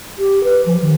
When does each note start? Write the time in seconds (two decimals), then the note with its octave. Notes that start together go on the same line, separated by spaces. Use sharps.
0.18 G4
0.43 B4
0.65 F3
0.81 D#3